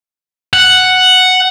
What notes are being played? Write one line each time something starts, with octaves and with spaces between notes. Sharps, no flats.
F#5